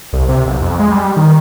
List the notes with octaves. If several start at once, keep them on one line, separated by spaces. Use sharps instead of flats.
C2
C3
B1
F2
G#3
G3
D#3